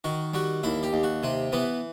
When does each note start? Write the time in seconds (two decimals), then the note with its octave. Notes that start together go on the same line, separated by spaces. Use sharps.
0.04 D#3 F#4
0.34 G3 F#4
0.63 D#2 E4
0.83 G4
0.93 D#2
1.03 F#4
1.23 C3 C4
1.52 E3 B3